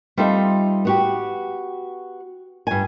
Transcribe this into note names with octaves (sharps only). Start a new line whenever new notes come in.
G3 C4 D#4 F4 A4 E5
B3 F#4 G4
G2 G#5